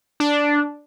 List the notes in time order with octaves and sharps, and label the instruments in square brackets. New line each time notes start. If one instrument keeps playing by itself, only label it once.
[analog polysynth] D4